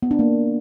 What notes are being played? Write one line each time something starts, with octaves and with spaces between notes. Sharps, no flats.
B3
D4
A#3